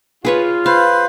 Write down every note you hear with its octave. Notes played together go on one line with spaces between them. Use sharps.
F4 G#4 B4 C#5
B4 C5 F5